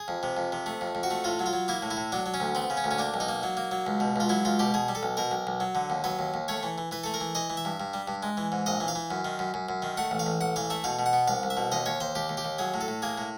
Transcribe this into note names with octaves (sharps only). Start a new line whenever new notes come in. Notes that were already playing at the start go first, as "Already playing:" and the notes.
Already playing: G#4
F2
C3
F2
C3
A3
F2
F2
F#4
A3
A2 F4
F#3
F4
F#3
A#3 E4
A2
E4
A2
F#3 D4
F#3
C#4
D2
B3 C4
C#3
C#4
D2
C#4
A#3 D4
B1
D#4
A#3
F#3
A#3
F#3
C#2
B2
C#2 F4
F#3 E4
C#2 F4
B2 G4
B2 G#4
G3
A4
B1
B2 A#4
B1
B1
F#3
D3
D#2
F#3 B4
D#2
D#2
A3 C#5
E3
E3
E3 B4
A3 A4
A#4
E3
E3 D#5
E3
E5
G2
G2
G3
G2
G#3
E3
G#2
A#1 D#5
E3
F5
E3
F#2
D#3
F#2
F#2
F#2
D#3
A3 F#5
A1
F5
A1
A1 F#5
E3 F5
A3 E5
B2 F5
B2
F#5
B3
C2 F5
C2
E5
B2
D#2 D#5
D#2 C#5
D#2 C5
D#2 G4
D#2
G4
D#2
F#3 G#4
A2
A4
A2
A#3 G#4
A2